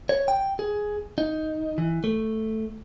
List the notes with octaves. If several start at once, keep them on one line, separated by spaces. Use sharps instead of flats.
C#5
G5
G#4
D#4
E3
A3